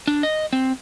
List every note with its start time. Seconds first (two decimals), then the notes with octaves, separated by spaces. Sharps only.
0.07 D4
0.23 D#5
0.53 C4